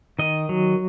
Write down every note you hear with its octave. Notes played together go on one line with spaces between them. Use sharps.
D#3 D#5
F#3